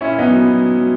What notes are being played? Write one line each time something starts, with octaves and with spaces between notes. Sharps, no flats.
A#2 C#4 E4
B3 D#4
F#3
B3
F#3
F#3